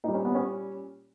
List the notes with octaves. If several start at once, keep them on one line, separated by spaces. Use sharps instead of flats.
A#2 G3 D#4
C#4
B3
C#4